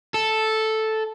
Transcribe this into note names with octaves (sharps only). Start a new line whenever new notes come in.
A4